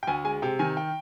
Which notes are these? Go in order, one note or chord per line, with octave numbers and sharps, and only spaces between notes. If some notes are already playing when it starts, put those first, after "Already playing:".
G5
D2 G#5
G#3 G#5
C3 G5
D#3 G#5
G5